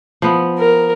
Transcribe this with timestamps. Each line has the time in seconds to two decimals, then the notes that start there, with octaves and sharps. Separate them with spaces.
0.22 F3 B3
0.58 A#4